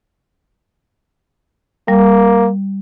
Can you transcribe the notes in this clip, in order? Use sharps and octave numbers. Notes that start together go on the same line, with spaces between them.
G3 A#3